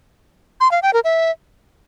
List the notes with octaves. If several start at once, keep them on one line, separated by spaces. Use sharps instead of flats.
C6
F5
G5
A#4
E5